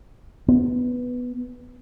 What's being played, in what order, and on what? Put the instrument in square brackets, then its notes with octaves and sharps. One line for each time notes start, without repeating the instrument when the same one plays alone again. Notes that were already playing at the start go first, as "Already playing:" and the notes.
[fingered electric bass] B3